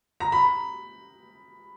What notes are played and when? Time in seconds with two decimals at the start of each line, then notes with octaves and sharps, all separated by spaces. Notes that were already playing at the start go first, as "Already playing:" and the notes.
0.20 A#5
0.32 B5